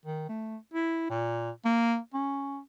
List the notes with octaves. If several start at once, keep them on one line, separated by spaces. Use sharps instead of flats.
D#3
A3
E4
A#2
A#3
C#4